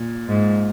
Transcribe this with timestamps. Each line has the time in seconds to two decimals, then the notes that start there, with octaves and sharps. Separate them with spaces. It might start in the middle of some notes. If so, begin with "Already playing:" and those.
Already playing: A#2
0.28 G#2